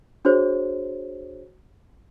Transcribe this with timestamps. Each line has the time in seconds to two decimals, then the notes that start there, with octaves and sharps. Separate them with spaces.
0.25 D4 F#4 G#4 C5 C#5